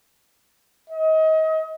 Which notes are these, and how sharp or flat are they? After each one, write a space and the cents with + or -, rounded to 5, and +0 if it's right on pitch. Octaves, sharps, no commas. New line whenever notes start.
D#5 +30